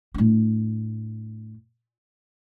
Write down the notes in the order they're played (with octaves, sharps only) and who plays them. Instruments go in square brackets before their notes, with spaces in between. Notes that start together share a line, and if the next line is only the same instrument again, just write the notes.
[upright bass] A2 D4